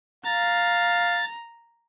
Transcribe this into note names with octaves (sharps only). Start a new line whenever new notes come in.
F5 A#5 A6